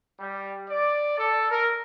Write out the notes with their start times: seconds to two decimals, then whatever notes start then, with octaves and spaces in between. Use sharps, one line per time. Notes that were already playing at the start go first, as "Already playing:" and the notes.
0.20 G3
0.70 D5
1.18 A4
1.51 A#4